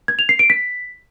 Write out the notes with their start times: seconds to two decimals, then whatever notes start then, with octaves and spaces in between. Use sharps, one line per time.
0.08 G#6
0.19 F7
0.29 C7
0.39 D7
0.50 B6